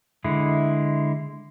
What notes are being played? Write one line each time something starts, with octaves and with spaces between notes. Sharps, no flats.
D3 G#3 E4